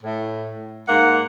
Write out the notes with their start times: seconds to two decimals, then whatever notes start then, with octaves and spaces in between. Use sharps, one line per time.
0.03 A2
0.87 G#2 A#3 F#5